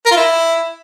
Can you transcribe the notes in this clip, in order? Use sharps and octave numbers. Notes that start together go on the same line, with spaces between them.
A#4
F4
E4